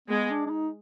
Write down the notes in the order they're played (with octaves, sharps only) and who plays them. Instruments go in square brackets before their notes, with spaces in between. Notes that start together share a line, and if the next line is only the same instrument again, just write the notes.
[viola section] G#3 [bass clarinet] B3
[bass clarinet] D4
D4
D#4